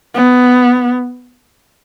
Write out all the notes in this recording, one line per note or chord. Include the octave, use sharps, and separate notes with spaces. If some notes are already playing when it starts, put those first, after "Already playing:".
B3